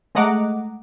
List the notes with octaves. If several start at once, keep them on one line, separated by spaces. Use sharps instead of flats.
G#3 A3 D#5 F#5 A#5 D6